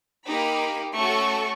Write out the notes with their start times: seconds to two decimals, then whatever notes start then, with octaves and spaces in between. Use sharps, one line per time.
0.28 A#3 D#4 G4 B5
0.96 A3 C#4 F#4 A4 C#6